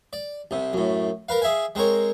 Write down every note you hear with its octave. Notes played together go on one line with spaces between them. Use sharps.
D5
C2 C3
F#2 A2
A#4 B4 F5
G#4 E5 F5 G#5
G#3 C4 A#4 C#5